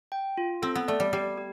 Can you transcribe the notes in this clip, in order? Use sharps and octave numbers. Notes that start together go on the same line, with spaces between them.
G5
F4
C4 A4
B3
A3 D5
G3
G3 G4
G4